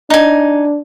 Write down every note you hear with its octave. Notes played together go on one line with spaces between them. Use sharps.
D4 D#4 G#5